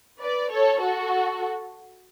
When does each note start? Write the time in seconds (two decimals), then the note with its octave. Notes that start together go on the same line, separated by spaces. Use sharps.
0.20 B4 D5
0.51 A4 C#5
0.81 F#4 A4